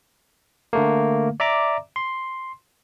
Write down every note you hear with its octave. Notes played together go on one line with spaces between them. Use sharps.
D3 A3 A#3
D5 E5 A#5 D6
C6